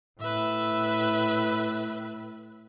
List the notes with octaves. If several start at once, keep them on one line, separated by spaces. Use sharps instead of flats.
A2 B4 E5